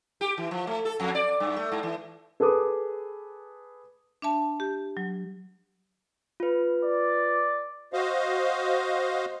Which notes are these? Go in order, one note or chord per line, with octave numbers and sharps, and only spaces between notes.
G4
E3
F3
A3
A4
F2
D5
G2
A3
G#2
E3
G#4 A4 B4 D6 D#6
D4 E5 A5
G4
F#3
F4 B4
D5
F#4 C5 D#5 F5